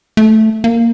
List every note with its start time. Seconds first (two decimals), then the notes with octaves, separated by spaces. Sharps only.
0.17 A3
0.64 A#3